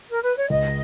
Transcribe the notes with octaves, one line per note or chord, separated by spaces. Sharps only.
A#4
B4
C#5
C#2 D#5